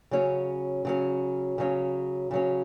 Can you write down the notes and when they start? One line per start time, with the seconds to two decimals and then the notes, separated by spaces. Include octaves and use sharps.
0.11 C#3 F#3 C#4
0.85 C#3 F#3 C#4
1.58 C#3 F#3 C#4
2.31 C#3 F#3 C#4